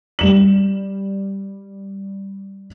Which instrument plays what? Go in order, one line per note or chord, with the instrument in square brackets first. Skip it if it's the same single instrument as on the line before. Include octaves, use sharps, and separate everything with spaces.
[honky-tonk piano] G3 E7 F#7